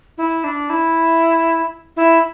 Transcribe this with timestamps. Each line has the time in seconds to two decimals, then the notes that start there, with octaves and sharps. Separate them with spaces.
0.18 E4
0.44 D4
0.70 E4
1.97 E4